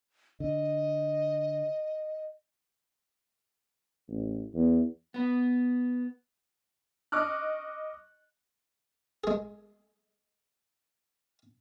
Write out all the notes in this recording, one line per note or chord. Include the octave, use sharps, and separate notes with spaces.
D3 D#5
A1
E2
B3 B4
D#5 C#6 D6 F6 F#6
G#3 G#4